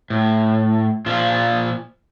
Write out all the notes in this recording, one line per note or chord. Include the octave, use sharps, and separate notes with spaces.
A2
A#2 F3 F4